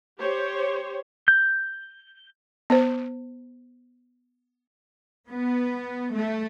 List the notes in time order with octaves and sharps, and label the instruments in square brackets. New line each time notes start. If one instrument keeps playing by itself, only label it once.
[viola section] G4 C5 C#5
[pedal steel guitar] G6
[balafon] B3 C5
[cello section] B3
A3